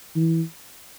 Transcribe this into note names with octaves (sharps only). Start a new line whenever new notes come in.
E3